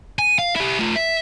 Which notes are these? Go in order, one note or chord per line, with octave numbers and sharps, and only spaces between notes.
G#5
F5
E4 G4
A3 F4
E5